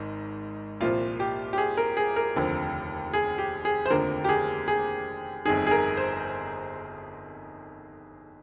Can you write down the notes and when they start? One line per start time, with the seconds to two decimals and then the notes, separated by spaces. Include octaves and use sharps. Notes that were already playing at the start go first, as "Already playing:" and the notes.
Already playing: G#1 G#2
0.81 C2 A#2 F3 F4
1.20 G4
1.53 G4
1.58 G#4
1.77 A#4
1.97 G#4
2.16 A#4
2.36 F1 D#2 D3 F3
3.14 G#4
3.38 G4
3.65 G#4
3.86 C5
3.90 F1 D#2 D3 F3 A#4
4.24 G4
4.29 G#4
4.68 G#4
5.45 G1 F2 D#3 G#4
5.67 G#4
5.71 A#4
5.97 C5